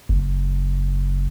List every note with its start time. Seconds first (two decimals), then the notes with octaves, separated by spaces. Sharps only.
0.09 F#1